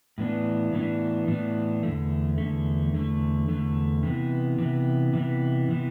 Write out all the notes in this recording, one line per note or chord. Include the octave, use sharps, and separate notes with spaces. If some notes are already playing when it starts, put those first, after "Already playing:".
A2 E3 B3 D4
A2 E3 B3 D4
A2 E3 B3 D4
E2 D3 A3
E2 D3 A3
E2 D3 A3
E2 D3 A3
C3 E3 B3
C3 E3 B3
C3 E3 B3
C3 E3 B3